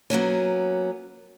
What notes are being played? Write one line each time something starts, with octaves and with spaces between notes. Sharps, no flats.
F#3 A#3 B3 C#4